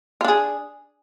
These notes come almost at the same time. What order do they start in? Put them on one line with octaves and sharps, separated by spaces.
F4 D4 G#4